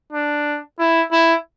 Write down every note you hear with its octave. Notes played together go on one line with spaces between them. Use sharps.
D4
E4
E4